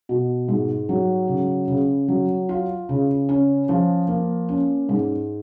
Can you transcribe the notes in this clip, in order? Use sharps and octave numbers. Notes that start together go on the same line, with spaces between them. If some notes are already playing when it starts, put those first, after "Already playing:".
B2
G#2
F#3
C#3
C#3
F#3
F4
C#3
C#4
F3
A#3
C#4
G#2